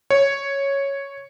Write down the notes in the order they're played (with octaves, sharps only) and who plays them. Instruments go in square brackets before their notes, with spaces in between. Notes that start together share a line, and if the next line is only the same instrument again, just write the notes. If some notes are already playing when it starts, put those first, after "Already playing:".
[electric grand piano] C#5